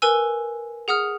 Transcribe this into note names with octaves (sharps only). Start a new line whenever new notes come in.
A#4 B4 G#5 E6
G#4 F#5 D#6 F6